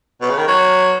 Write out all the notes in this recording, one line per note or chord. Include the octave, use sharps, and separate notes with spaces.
B2
C#3
D#3
F#3